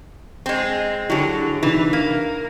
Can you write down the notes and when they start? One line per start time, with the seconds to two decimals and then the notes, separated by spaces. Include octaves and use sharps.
0.46 G#3 C4
1.10 D3 F#3 E4 G4 G#4
1.63 C3 E3 D4 D#4
1.93 A#3